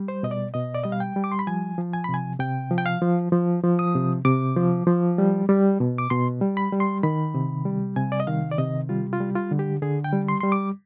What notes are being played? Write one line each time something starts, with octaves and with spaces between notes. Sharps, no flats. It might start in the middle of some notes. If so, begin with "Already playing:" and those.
Already playing: G3
C5
B2 D#5
D5
B2 D#5
D5
G3 D#5
F5
G5
G3
D6
C6
B5
F3 G#5
F3
G#5
C3 B5
G#5
C3 G5
F3
G5
F5
F3
F3
F3
D#6
C3
C3 D6
F3
F3
G3
G3
B2
D6
B2 C6
G3
B5
G3
C6
D#3 B5
C3
G3
C3 G#5
D5
D#5
D#3 F5
D5
C3 D#5
G3 F4
F4
G3
F4
D3
G4
D3 G#4
G5
G3
C6
G3 C6
D6